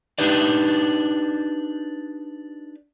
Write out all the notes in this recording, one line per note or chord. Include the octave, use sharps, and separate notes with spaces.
D4 D#4 G4 B4 D5